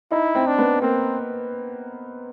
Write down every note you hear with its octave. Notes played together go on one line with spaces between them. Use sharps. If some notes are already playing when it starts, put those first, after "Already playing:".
D#4 E4
C4
D4
B3
A#3 C4